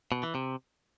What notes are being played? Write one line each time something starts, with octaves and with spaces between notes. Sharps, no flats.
B2
E3
C3